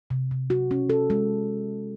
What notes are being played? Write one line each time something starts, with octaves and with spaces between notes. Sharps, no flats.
C3
C3
F#4
C#4
A4
G#3